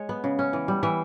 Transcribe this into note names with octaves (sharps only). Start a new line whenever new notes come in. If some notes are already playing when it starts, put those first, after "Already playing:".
Already playing: G#3 C#5 D#5
B3
C#3
C#4
E3
G3
E3 E5